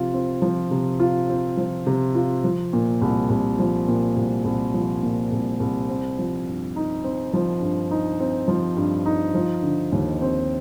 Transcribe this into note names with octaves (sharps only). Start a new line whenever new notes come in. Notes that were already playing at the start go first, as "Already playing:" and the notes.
Already playing: C3 F3 F4
C4
F3
C3
F4
C4
F3
C3
F4
F3
A#2
C2
C2
F3
A#2
C2
C2
F3
A#2
C2
C2
C4
F3
G2
D#4
C4
F3
G2
D#4
C4
F3
G2
D#4
F3
D3
D#2
C4